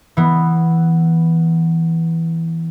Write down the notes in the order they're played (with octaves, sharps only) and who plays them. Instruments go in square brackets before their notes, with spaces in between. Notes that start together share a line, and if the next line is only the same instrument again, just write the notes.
[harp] E3 B3